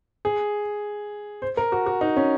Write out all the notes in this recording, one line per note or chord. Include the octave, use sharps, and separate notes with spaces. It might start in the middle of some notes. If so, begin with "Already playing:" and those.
G#4
C5
A#4
F#4
F#4
D#4
C#4